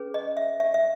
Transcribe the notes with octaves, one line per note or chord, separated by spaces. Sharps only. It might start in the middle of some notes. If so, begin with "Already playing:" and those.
Already playing: C#4 G#4 B4
D#5
E5
E5
E5